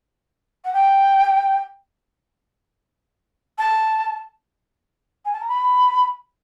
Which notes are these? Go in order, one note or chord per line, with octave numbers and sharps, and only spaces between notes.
F#5
G5
A5
G#5
A5
A#5
B5